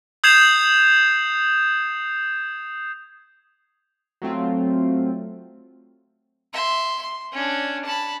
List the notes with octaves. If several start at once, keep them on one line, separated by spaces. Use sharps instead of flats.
D#6 G6 G#6 C7 E7 F7
F#3 A3 C4 F4
E5 C6
C6
C#4 D4
A5 B5